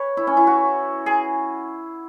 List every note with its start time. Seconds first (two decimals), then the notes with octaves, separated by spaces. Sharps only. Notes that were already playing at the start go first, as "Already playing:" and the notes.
Already playing: B4 C#5
0.17 E4
0.27 C#4
0.37 E4
0.47 F#4
1.06 G#4